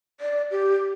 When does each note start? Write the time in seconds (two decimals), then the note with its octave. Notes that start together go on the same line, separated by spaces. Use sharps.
0.20 D5
0.51 G4